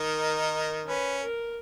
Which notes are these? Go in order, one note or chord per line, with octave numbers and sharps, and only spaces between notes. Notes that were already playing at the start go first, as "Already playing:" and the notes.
Already playing: D#3 D#4 A#4
C#4 B4
A#4